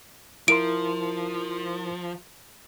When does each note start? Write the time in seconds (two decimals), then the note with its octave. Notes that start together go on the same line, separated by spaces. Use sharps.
0.48 F3 E4 A#4 C6 D7